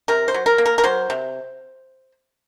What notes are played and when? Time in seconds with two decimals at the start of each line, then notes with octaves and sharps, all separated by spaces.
0.08 C3 A#4
0.28 C5
0.34 F#3
0.46 A#4
0.58 A#3
0.66 A#4
0.78 A#4
0.84 F#3 C5
1.10 C3